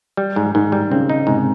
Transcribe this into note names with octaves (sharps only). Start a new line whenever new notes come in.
G3
G#2
G#2 D#3
G3
C#3 C4
D#4
G#2 C3